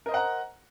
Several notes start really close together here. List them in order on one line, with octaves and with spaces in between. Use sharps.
A#4 D#5 C5 F#5 A#5